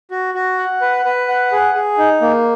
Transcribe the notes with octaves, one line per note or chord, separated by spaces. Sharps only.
F#4
F#4
F#5
B4
B4
F#5
G#4
G#4
D#4
A#3